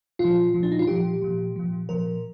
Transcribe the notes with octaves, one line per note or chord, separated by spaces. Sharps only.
A#2 F3 F4
A#2 F3
D4
D#4
F4
A#2 F3 G4
A#2 F3
A#2 F3
A#2 F3 A#4